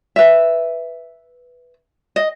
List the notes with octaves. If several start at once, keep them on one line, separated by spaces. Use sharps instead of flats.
B4 E5
D#5